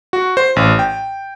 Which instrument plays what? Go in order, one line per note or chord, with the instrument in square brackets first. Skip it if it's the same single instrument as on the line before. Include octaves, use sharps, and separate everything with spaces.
[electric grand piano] F#4
C5
A1
G5